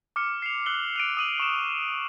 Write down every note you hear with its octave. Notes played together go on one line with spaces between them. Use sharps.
D6 F6 C#7
C7 F7
E6 F#6 C7 F#7 G7
D7 D#7 F7
D#6 D#7 F#7
C#6 E7